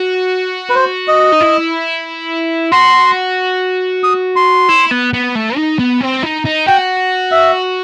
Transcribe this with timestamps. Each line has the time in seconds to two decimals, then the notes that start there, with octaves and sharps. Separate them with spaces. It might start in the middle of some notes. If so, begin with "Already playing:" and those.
Already playing: F#4
0.69 B4
0.75 C5
1.08 D#5
1.32 D#4
1.40 E4
2.72 F#4 C6
4.03 D#6
4.36 C6
4.69 E4
4.91 B3
5.13 B3
5.35 A3
5.57 D#4
5.79 B3
6.01 C4
6.22 D#4
6.45 D#4
6.66 F#4 G5
7.32 E5